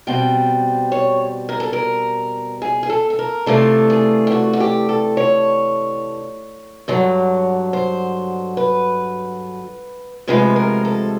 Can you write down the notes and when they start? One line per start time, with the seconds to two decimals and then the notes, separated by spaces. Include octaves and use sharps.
0.07 B2 G3 C4 G5
0.92 C#5
1.49 A#4
1.60 A4
1.73 A#4
2.62 G#4
2.83 G#4
2.90 A4
3.10 A4
3.19 A#4
3.46 C3 E3 A3 D4 F4 A4
3.90 G#4
4.27 G4
4.32 F#4
4.53 F#4
4.60 G4
4.89 A4
5.17 C#5
6.88 G2 D3 F#3
7.73 C5
8.57 B4
10.27 D2 C3 F3 G#3 B4
10.56 A#4
10.85 A4